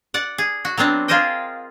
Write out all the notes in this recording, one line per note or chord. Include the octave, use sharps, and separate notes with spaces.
D5 F#5
G#4
F#4
F#3 B3 C4 D4
F4 G#4 A#4 C5 D#5 G5